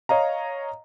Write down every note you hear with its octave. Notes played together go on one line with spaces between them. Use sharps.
C#5 D#5 F5 A#5